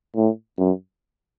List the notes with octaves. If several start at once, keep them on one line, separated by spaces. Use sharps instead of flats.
A2
F#2